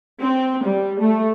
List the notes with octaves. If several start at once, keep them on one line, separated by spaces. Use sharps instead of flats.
C4
G3
A3